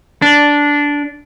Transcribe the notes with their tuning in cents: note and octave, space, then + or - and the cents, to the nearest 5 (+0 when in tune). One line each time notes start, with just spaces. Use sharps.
D4 -10